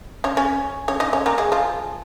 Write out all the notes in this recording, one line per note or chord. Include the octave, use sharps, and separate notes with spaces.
C#4 C#5
C#4 C#5
C#4 C#5
D#4 D#5
C#4 C#5
A#3 A#4
G#3 G#4
F3 F4